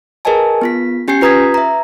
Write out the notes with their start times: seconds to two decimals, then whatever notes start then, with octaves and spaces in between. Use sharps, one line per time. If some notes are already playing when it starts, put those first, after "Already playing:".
0.25 G#4 A#4 B4 D#5 G#5 A5
0.62 B3 F4 B6
1.08 C#4 G4 G#5 G6 C7 C#7
1.21 F4 B4 A#5 D#6 G#6 B6
1.54 E5 A#5